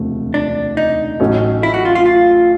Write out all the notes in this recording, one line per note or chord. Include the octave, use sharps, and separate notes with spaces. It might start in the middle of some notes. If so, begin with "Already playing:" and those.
Already playing: E1 D2 C3 F3 A3
D4
D#4
A1 A2 F#3 A3 C#4
E4
F#4
F4
F4
F4